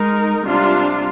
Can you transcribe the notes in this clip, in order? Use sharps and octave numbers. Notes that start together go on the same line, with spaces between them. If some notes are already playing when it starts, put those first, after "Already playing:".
Already playing: G#3 D#4 A#4
C3 G3 D4 F4